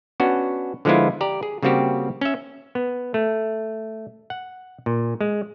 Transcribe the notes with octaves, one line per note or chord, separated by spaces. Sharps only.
B3 C#4 D4 F#4
D3 F3 G#3 B3 E4 F4
G4 D5 A#5
G#4
C#3 G3 A#3 C4 F#4 G4
C#4 E5
B3
A3
F#5
A#2
G#3